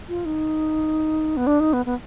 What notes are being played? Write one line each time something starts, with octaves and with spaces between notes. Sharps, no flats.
F4
D#4
B3
D4
D#4
B3
B3